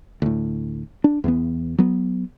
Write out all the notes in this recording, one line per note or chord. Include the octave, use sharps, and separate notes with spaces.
D2 A2
D4
E2 E3 B3
F#3 B3